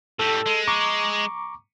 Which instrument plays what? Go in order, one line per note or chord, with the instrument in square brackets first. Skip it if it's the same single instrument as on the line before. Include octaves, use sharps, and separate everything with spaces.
[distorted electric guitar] A2 G3 [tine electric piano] A4
[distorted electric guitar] G#3
[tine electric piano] A#5 C#6 D6